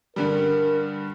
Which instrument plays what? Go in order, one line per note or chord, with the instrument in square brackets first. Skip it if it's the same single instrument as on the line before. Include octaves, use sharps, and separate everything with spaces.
[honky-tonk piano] G2 D3 G3 [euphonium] A#4